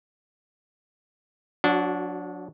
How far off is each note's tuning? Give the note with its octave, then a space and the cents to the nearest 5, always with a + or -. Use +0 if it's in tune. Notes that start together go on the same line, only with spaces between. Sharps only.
F#3 -35 D4 -15 F#4 +0